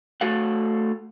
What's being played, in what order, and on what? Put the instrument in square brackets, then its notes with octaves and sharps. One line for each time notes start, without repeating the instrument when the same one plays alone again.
[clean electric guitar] A3 F#4 A4 F5 F#5